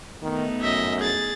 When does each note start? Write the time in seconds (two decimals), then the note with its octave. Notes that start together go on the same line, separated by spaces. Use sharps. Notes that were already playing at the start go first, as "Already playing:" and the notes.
0.22 D#3 A3 B3 D#4
0.61 F#2 D#5 E5
1.00 G#4 A6